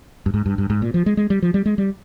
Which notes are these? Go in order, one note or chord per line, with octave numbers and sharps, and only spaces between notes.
G2
G#2
G2
G2
G#2
A#2
F3
G#3
G#3
G3
F3
G3
G#3
G3